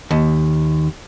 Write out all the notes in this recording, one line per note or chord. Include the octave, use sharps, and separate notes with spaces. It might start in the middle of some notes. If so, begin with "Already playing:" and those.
D#2